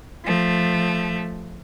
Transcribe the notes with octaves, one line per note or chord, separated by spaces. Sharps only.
F3 A3